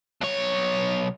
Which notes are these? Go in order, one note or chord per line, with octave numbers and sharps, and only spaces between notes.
B1 C#5